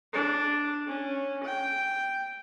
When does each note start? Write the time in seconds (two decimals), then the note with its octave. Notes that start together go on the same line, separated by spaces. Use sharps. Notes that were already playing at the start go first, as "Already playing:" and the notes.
0.13 D4
0.87 C#4
1.45 G5